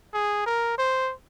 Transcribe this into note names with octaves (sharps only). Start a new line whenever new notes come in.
G#4
A#4
C5